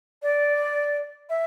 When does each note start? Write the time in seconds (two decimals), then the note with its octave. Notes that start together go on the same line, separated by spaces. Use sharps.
0.22 D5
1.29 E5